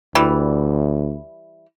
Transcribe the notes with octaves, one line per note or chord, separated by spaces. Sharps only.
D2 E3 G3